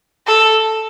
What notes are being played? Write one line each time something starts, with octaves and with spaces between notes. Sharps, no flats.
A4